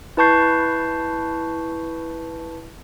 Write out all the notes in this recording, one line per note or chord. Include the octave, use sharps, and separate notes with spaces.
E4 B4 A5 C#6 G6 C7